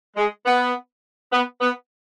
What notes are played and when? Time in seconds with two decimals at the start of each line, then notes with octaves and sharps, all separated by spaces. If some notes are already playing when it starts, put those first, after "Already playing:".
0.16 G#3
0.46 B3
1.32 B3
1.61 B3